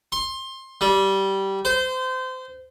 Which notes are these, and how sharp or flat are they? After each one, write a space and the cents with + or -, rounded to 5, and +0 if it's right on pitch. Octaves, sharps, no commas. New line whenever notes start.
C6 +20
G3 -15
C5 -25